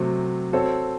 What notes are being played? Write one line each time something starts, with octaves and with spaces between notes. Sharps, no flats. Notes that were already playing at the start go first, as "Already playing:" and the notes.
Already playing: C3 F#3 A3 C4
C4 F#4 A4 C#5